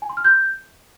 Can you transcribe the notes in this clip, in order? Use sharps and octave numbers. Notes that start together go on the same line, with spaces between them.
G#5
C6
F6
G6